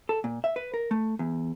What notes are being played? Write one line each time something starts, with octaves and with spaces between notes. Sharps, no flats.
A4
A#2
E5
B4
A#4
A3
E2